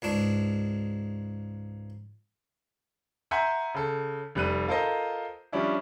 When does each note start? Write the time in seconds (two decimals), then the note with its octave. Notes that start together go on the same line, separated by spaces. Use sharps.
0.02 C#2 G#2 D4
3.31 E5 F#5 G#5 A#5 C6 G6
3.75 C#3 A4
4.35 F1 G3 F#6 D#7
4.68 F4 A4 A#4 C5 D#5
5.52 F3 G3 C#4 D4 E4